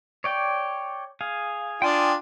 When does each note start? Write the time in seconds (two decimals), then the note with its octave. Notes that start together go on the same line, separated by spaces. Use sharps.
0.24 C#5 D5 G5
1.21 G#4 F5
1.82 D4 F4 G5 G#5 D#6